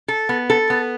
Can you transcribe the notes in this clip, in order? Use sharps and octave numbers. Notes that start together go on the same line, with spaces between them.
A4
B3
A4
B3